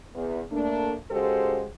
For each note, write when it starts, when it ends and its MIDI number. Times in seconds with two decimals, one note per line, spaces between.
0.14 0.39 40
0.52 0.94 57
0.52 0.94 58
0.52 0.94 62
1.11 1.64 49
1.11 1.64 56
1.11 1.64 66
1.11 1.64 67
1.11 1.64 69
1.11 1.64 72